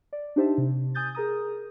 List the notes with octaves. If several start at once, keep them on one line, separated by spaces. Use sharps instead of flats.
D5
D4 D#4 G4 C5 E5 A5
C3
G#5 D#6 G6 A6
G#4 A#4 A#5 D#6